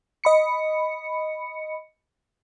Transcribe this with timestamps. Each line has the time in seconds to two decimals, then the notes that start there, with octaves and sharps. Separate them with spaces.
0.24 D#5 B5 C#7